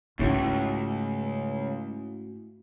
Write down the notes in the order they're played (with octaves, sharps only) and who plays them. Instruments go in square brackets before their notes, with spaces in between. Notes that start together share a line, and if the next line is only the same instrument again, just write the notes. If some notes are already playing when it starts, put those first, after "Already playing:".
[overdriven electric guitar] C#2 [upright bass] G#2 A3 [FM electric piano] C#4 E4 F#4